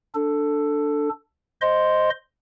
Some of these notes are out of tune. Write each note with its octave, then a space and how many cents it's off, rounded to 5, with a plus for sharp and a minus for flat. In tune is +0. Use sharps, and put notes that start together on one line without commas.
D4 +0 A4 +10
C5 +0 D#5 +0 C6 +0